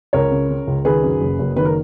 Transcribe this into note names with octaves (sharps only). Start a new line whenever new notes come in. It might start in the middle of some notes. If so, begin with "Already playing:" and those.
C#2 A#4 C#5
C#3
C#3
C#2
D#3 G#4 B4
F#2
F#1
F#1
D#3 B4
A#4